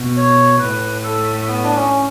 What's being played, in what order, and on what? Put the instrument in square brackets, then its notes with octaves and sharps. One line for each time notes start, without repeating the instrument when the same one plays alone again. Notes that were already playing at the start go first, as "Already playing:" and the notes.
Already playing: [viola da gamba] B2
[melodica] C#5
[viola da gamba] A2 [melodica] B4
[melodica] A4
B3
D4
C#4